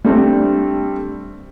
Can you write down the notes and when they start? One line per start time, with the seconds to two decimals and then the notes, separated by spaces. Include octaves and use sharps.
0.04 G3 A3 C4 D4